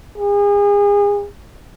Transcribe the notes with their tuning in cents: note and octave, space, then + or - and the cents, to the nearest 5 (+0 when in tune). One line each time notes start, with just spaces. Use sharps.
G#4 -35